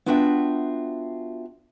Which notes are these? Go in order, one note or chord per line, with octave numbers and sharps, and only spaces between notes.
B3 D4 F4 F#4 E5 G5